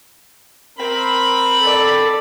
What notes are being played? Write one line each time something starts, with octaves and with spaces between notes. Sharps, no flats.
C4 A#4 B5
A4 D5